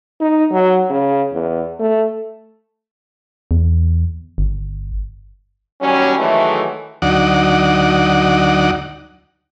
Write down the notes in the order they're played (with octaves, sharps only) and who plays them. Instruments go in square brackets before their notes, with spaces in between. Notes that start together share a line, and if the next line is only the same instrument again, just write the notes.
[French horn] D#4
F#3
C#3
E2
A3
[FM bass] E2
G1
[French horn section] D#2 F#3 G3 C#4
D#3 E3 F#3 G#3 A3
[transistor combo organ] D2 F#3 D#4 D5 F#5